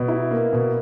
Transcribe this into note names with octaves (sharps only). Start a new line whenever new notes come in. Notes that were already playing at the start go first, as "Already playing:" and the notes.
Already playing: B2
E4
A#3
B2